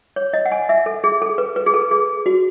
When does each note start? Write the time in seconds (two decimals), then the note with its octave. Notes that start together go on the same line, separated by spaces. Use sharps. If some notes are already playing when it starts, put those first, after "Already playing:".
0.16 C#5
0.33 D#5
0.46 F#5
0.52 G#5
0.69 E5
0.86 A4
1.04 G#4
1.22 A4
1.38 B4
1.56 B4
1.66 G#4
1.74 A4
1.91 G#4
2.26 F#4